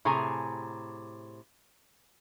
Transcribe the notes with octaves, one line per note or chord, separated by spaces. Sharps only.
A2 C3 G#4 G#5 A#5